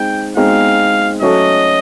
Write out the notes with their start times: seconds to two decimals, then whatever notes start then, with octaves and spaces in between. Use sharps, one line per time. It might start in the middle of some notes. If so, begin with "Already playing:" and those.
Already playing: G#3 C4 D#4 G5
0.37 G#3 C4 D#4 F5
1.21 F#3 A3 C#4 F#4 A4 D#5